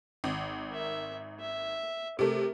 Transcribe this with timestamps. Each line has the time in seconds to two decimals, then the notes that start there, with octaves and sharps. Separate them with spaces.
0.24 G#1
0.71 A#4 E5
1.40 E5
2.19 C3 A3 A#4